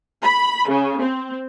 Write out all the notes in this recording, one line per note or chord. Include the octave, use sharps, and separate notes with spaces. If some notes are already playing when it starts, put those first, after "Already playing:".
B5
C#3
C4